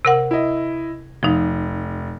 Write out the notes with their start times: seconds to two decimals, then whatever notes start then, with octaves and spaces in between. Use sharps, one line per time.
0.05 C3 A#4 F#5
0.31 E4 D#5
1.23 F1 F3 D#4